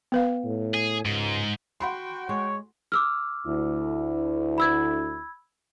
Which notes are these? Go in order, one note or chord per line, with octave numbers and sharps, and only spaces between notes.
B3 B4 F5
A2
G#4
C#2 G#2
F#4 F#5 G5 B5 C6
G#3 C#5
D6 E6 F6
D2 E4
B5 E6 G#6